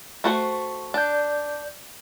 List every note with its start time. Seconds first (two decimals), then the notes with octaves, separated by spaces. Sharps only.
0.24 A3 F#4 C5
0.94 D4 D5 G6